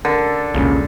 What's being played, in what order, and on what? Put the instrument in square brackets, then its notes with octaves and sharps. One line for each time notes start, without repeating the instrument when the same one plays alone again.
[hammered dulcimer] D3 [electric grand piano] A4 A#4
[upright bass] E1 [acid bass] C2 [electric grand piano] A#2 C#3